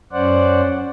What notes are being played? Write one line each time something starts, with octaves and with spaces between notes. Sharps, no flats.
F#2 C#4 C5 D5 F#5